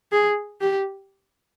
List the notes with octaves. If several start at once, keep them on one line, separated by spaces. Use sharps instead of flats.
G#4
G4